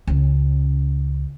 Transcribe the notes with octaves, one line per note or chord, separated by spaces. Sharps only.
C#2 C#3